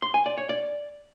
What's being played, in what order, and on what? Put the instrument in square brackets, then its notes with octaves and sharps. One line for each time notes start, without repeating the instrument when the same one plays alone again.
[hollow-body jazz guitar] C6
G#5
D5
C#5
D5